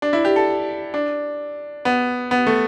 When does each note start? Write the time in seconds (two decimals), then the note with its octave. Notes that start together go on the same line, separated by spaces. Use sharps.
0.02 D4
0.13 E4
0.25 G4
0.36 A4
0.94 D4
1.85 B3
2.31 B3
2.47 A3